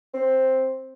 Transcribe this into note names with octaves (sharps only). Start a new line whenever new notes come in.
C4